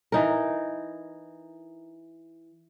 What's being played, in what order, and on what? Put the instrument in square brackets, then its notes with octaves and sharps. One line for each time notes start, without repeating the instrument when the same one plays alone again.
[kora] E3 D#4 A#4